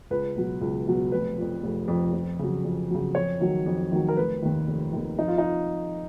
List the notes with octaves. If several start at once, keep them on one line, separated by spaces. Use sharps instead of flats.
C#2 B4
B2 F#3
C#2
B2 F#3
F1 B4
F2 F3
F1
F2 F3
F2
C#3 F#3
F2
C#3 F#3
F2 C#5
D#3 F#3
F2
D#3 F#3
A#4
F1 B4
D#2 D#3
F1
D#2 D#3
F2 D#4
F4
D#4